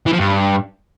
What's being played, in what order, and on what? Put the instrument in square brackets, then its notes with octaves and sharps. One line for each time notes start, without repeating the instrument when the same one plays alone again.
[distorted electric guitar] E3
F3
G2